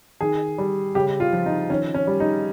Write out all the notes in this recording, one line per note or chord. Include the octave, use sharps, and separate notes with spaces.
D#3 G#4
G3
C#3 G4
F4
F3
D#4
D#3 C#4
C#4
G3
D#4